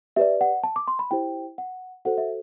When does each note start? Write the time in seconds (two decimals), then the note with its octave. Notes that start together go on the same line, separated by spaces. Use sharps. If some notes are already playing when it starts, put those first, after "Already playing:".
0.16 G4 B4 D5 E5
0.41 F#5
0.64 A5
0.76 D6
0.88 C6
0.99 B5
1.11 E4 G4 C5 G5
1.58 F#5
2.05 F#4 A4 C5 F#5
2.18 E5